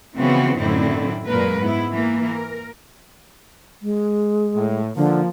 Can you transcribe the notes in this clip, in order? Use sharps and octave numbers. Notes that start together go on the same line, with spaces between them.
C#3 E3 F3 B3 C4 F#4
F#2 A2 D3 D#3 C4 E4
F#2 A#2 G#3 A#4 B4
G#2 B3 E4
E3 A#3
A#4
G#3
A2
D3 F3 A#3